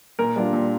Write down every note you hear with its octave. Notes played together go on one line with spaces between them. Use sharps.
A#2 A#4
G3 D4 F4
A#2